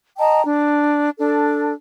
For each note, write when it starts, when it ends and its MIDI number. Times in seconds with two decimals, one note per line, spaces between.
0.18 0.41 75
0.18 0.41 79
0.18 0.41 81
0.18 0.41 82
0.44 1.09 62
1.18 1.73 62
1.18 1.73 69